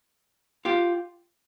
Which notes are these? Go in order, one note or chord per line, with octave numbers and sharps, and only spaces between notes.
F4 G4